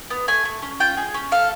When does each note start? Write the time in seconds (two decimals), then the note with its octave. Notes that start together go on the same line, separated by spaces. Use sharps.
0.10 B3
0.28 A3 G#5
0.45 A3
0.62 C#4
0.80 F4 G5
0.97 G#4
1.14 C#4
1.32 A4 F5